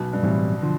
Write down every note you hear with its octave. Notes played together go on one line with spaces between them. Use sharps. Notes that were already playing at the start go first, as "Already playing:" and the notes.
Already playing: B1 B2
G2
A2 E3 G3 C4 E4
D3 F3